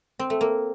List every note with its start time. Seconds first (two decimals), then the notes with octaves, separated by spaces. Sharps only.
0.19 C4
0.30 A3
0.41 A#3